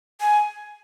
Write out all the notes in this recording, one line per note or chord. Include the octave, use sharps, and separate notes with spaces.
G#5